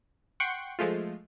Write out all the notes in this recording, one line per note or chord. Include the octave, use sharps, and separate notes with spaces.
F#5 G5 C6 C#6 F#6
F3 G#3 A3 F4